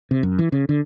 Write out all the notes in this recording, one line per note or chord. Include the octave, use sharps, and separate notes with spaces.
C3
F#2
E3
C#3
D3